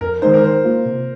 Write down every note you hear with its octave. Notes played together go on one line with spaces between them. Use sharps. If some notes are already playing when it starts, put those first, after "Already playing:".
F2 A#4
D#3 G#3 D#4 C5
A#4
D#3 C5
A#3 F4
C3